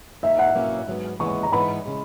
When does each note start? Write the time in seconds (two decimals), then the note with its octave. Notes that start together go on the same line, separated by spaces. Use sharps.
0.23 D#2 D#3 A#3 D#4 E5
0.39 F#5
0.55 B2 F#3 A#3 C#4 E4
0.88 G#2 F#3 B3
1.19 D#2 C#3 E3 G#3 B3 C#6
1.43 A#5
1.52 G#2 E3 B3 D#4 B5
1.86 C#3 G#3